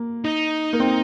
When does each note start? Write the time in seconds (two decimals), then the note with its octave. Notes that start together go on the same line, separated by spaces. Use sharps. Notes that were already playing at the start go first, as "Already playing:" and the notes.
Already playing: A#3
0.24 D#4
0.73 A#3
0.80 C4